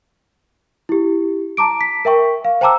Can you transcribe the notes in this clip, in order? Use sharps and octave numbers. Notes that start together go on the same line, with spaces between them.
E4 G4
A5 A#5 D6 D7
B6
A#4 E5 G5 C#6
F5
C5 G5 A5 A#5 D6 E6